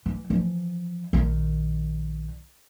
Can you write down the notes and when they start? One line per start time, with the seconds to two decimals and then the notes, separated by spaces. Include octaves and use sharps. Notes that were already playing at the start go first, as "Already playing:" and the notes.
0.06 E3
0.30 E3 F3
1.13 A#1 D#3